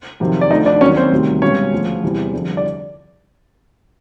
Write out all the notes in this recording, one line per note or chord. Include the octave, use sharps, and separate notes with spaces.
F2 C3 D#3 F#3
D5
D2 D3 F3 D#4 D#5
D4 D5
D#2 D#3 F#3 C#4 C#5
C4 C5
D2 C3 D#3 G3
C#2 B2 G3 C#4 C#5
D2 C#3 F3
E2 C3 E3 G3
F2 D3 G3
D5